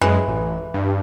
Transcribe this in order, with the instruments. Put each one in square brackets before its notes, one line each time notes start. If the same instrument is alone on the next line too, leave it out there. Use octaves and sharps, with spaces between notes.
[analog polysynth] F#2 G#3 [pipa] E3
[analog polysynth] A1
G2